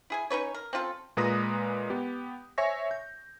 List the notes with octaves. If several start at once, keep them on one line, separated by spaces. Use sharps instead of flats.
E4 G#4 G#5
C#4 D#4 B4 C#5
A#4
C4 C#4 F4 A4
A#2 G#3 B4 A#5 D#6 A#6
B3 G4
C5 C#5 E5 G#5 C#6 A#6
G6